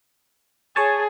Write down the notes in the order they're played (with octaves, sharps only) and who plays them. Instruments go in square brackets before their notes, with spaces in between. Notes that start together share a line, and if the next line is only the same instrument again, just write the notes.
[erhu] G#4 [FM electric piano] C#5 G#5 A5